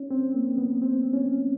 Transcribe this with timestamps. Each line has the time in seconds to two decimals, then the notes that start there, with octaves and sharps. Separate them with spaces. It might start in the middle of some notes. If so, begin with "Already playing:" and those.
Already playing: C#4
0.11 C4
0.34 A#3
0.58 B3
0.82 C4
1.13 C#4